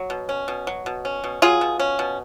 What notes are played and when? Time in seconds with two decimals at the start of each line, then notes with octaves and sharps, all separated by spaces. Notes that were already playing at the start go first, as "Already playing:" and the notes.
Already playing: F#3
0.10 B2
0.29 C#4
0.48 B2
0.67 F#3
0.86 B2
1.05 C#4
1.24 B2
1.42 F#3 F4 G#4
1.61 B2
1.79 C#4
1.99 B2